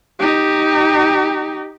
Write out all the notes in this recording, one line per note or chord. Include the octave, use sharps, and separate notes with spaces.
D#4 G4